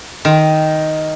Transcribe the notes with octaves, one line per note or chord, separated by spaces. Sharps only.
D#3